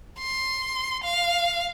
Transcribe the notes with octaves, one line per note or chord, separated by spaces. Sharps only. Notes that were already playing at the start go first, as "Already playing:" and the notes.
C6
F5